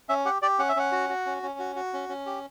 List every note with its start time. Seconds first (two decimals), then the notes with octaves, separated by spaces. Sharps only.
0.09 C#4 E5
0.25 G4 F#5
0.42 G4 D5
0.59 C#4 F#5
0.69 E5
0.76 C#4 F#5
0.92 F#4
1.09 F#4
1.26 C#4
1.43 C#4
1.59 F#4
1.76 F#4
1.93 C#4
2.09 C#4
2.26 G4